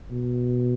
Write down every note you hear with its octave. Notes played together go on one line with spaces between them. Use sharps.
B2